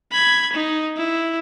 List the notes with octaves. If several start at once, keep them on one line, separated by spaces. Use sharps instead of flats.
B5 G#6
D#4
E4